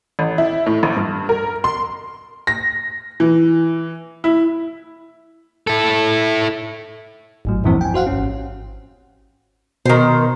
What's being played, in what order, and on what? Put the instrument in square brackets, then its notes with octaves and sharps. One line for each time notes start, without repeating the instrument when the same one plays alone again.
[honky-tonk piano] A1
E4
A2
A#1
G2
A#4
C6
[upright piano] A#6
E3
E4
[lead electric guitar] E4 A4
[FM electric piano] G#1 A2 F#3
E2 G2 A#2 E3 F3 C4
G5 G#5
F#4 C5 F5 F#5
G#1 C#4
[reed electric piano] B2 [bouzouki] D#3 C5